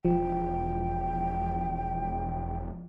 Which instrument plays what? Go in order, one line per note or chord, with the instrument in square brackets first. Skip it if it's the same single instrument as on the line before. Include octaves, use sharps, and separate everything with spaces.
[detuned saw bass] E1 [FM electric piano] F3 [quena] G5